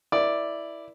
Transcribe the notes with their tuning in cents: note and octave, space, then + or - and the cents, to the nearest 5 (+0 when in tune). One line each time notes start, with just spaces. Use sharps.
E4 +0 A#4 +40 D5 +0